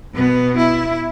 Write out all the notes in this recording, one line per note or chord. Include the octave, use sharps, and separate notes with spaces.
B2 B3
E4